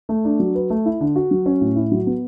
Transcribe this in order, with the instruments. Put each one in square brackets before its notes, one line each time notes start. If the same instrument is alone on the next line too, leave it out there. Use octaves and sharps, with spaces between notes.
[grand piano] A3
D4
F#3
B4
A3
E4
D3
F#4
F#3
C#4
A2
E4
F#3
B3